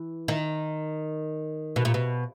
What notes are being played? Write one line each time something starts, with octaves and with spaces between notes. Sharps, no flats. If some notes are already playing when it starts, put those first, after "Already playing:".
Already playing: E3
D#3
B2
A#2
B2